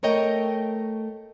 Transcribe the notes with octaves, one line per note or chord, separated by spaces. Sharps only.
A3 A#4 C#5 D#5 G5